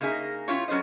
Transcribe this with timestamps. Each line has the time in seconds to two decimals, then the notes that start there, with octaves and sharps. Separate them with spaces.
0.01 C#3 A#3 D#4 G#4 E5
0.48 C#4 E4 F4 G4 C#5
0.68 F#3 C#4 A4 C5 D#5